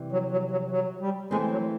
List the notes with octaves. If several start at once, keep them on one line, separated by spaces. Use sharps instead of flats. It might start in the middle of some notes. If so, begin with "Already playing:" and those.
Already playing: C3 E3 G3
F#3
F#3
F#3
F#3
G3
E3 G#3 A3 C4
F#3